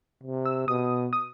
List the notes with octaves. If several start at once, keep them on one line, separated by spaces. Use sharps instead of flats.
C3
E6
B2 D#6
D#6